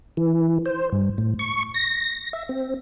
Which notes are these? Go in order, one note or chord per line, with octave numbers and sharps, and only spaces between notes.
E3
C5
G2
A2
C#6
A#6
E5
C4